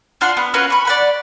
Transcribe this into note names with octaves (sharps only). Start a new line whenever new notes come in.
D4 F4 F#5 C6
B3
C#4 F4 F#4 B4
B5 C#6
D5 F#5 B5